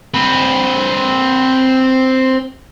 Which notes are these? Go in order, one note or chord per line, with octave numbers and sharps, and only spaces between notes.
C4 B4